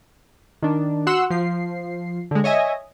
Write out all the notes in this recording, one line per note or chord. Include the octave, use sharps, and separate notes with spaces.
D#3 D4
F#4 F#5 C6 E6
F3 C7
D3 G#3
C#5 D#5 E5 G#5